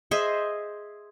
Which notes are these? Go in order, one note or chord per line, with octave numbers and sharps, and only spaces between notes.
G#4 C5 D#5 E5